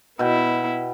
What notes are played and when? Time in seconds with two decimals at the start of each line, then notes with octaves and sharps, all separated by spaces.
0.19 B2 B3 E4 G5